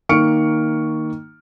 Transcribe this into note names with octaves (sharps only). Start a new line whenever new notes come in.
D#3 A#3 C#6 F6 C#7 D7